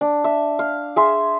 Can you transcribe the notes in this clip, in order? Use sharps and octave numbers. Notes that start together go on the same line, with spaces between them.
D4
E5
F5
G#4 E5 C6